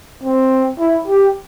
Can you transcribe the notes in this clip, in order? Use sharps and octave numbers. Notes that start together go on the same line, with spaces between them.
C4
E4
G4